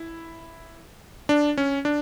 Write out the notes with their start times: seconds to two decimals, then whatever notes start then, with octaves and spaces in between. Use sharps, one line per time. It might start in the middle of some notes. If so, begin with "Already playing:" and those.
Already playing: E4
1.29 D4
1.57 C#4
1.85 D4